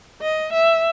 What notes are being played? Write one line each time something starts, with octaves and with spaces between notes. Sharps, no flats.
D#5
E5